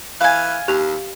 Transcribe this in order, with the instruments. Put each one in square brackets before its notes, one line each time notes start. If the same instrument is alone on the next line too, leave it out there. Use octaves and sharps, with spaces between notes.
[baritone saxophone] E3 [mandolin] F5 G#5
[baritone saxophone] D#2 [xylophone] G4 F#6 F7